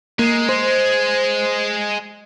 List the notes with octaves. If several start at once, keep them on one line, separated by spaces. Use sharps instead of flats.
G#3 A#3
C5